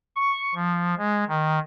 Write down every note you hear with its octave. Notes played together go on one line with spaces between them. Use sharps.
C#6
F3
G#3
D#3